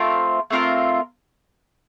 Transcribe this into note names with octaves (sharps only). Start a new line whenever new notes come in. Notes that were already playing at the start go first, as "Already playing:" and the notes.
Already playing: A3 C4 F4 A#4
A3 C4 F4 A#4